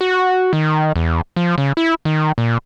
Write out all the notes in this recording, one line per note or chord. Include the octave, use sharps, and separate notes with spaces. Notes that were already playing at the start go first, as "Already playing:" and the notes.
F#4
D#3
E2
F3
C#3
E4
D#3
A#2